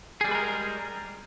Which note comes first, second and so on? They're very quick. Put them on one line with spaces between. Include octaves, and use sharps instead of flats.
G#4 G3 G#3 B4 A#4